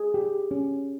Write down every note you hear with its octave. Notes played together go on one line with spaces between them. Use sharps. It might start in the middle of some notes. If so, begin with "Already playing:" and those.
Already playing: G#4
G4
C#4